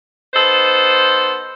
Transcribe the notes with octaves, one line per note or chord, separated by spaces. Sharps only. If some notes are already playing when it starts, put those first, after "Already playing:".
B3 D#4 A4 C5